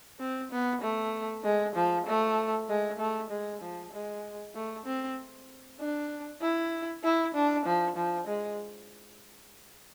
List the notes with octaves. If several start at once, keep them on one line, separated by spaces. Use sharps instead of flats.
C4
B3
A3
G#3
F3
A3
G#3
A3
G#3
F3
G#3
A3
C4
D4
E4
E4
D4
F3
F3
G#3